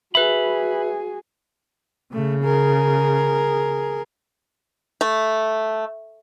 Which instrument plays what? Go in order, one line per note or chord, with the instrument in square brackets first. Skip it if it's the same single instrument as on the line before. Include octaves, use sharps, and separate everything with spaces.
[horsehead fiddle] F#4 G#4 [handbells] B4 E5 [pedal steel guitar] B5
[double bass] C#3 [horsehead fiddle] A3
[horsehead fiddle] G#4 A#4
[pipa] A3